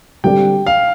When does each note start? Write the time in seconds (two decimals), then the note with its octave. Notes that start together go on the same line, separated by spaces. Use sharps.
0.24 D3 G3 C4 G4 D5 G5
0.67 F5